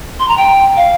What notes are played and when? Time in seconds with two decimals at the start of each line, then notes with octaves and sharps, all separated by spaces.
0.19 C6
0.28 A#5
0.37 G5
0.76 F5